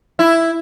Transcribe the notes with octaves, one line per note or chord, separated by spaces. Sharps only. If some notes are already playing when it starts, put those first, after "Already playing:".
E4